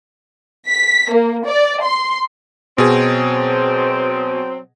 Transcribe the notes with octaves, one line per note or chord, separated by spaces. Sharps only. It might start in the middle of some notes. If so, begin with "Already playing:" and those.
B6
A#3
D5
C6
B2 F#3 C4 G#4